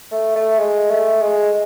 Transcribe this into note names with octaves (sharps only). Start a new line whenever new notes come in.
A3
A3
G#3
A3
G#3